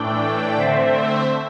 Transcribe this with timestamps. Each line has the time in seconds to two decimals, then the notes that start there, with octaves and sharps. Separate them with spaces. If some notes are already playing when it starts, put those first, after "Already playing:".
Already playing: A2 E3 A3 D4 D5 G5
0.57 D3 A3 C4 C5 E5